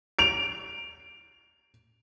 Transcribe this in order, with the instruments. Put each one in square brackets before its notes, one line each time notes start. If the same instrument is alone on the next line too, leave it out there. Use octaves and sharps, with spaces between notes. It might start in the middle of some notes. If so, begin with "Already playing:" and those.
[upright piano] D7 F7